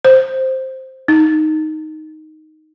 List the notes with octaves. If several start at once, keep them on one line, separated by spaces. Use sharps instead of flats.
C5
D#4